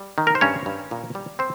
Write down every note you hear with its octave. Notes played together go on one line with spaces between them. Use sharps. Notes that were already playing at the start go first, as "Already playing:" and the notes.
Already playing: G3
D#3
A#4
C5
G2 C#4 C#5
G2
A#2
G3
C4 C5